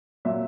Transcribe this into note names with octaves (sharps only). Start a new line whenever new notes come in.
A#2 F#3 E5